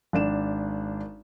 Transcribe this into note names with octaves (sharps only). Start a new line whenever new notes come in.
G#1 D4 E7